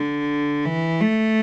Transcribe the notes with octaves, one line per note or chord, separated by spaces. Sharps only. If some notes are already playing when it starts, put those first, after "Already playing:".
Already playing: D3
E3
A3